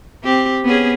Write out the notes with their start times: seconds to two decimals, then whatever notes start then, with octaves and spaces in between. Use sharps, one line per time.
0.24 C4 G4
0.65 B3 C#4 G#4